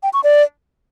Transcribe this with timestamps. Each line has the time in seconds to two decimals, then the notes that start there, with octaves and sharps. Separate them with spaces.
0.03 G5
0.13 C#6
0.24 D5